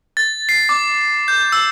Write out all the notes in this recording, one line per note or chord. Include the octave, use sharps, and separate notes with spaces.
A6
C7
D6
G6
E6